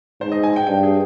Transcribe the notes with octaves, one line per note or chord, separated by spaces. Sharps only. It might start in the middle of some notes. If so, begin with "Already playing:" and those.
G#2 C5
D#5
G#5
G5
G2 G5
G#4